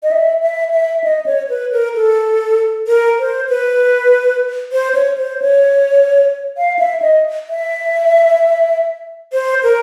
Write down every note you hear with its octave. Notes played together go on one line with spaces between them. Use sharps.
D#5
E5
E5
E5
D#5
C#5
B4
A#4
A4
A#4
C5
B4
C5
C#5
C5
C#5
F5
E5
D#5
E5
C5
A#4